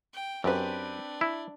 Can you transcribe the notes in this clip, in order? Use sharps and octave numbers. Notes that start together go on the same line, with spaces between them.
G5
F#2 C4 D4 G4 B4
E4